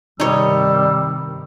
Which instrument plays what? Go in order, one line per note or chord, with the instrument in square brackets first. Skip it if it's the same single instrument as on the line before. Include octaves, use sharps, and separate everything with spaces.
[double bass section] G2 C3 D#3 [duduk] G3 [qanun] D#4 C#5 [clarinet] E6